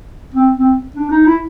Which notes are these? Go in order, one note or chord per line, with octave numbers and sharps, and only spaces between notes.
C4
C4
D4
D#4
E4